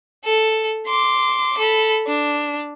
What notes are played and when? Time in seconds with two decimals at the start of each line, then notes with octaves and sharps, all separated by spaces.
0.24 A4
0.86 C6 D6
1.58 A4 B5
2.07 D4